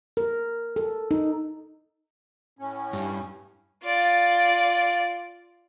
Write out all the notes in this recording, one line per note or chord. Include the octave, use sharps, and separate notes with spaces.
A#4
A4
D#4
A2 C#4
G2
F4 D5